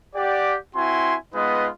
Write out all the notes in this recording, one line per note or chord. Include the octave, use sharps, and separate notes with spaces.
G4 D5 F#5
C4 E4 F#4 G#5 C6
G#3 B3 D#4 F4 B4 D#5